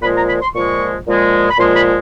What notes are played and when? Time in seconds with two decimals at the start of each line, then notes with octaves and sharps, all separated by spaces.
0.02 A#2 F3 G#3 B5
0.16 A#5
0.28 B5
0.42 C6
0.54 A#2 F3 G#3 C#6
1.07 A#2 F3 G#3
1.50 B5
1.58 A#2 F3 G#3 C6
1.76 B5